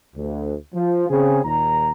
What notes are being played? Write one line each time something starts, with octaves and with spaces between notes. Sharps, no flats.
D2
F3
C#3 C4 G#4
D#2 A#2 A#5